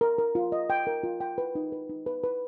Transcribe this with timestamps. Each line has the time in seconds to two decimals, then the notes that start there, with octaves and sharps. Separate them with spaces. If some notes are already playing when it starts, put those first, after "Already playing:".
0.01 A#4
0.19 A#4
0.35 F4
0.52 D#5
0.70 G5
0.87 A#4
1.03 F4
1.20 G5
1.38 B4
1.55 D#4
1.72 B4
1.89 D#4
2.06 B4
2.24 B4